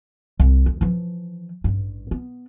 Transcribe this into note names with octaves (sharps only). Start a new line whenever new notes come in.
C2
D2
E3 F3
A1 G2
B3